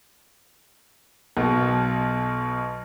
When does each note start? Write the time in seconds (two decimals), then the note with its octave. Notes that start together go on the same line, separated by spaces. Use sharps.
1.37 B1 B2